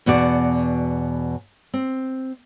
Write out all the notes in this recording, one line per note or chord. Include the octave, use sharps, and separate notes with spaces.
E2 B2 F#4 D5
C4